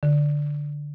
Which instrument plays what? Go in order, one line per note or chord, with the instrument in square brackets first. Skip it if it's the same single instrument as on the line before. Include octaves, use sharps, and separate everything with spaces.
[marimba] D3